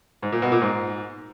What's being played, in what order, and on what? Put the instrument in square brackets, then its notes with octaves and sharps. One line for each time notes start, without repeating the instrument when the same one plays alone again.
[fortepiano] G#2
A#2
B2
A#2
G#2